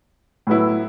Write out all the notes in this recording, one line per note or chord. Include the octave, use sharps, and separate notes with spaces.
A2 F#3 B3 E4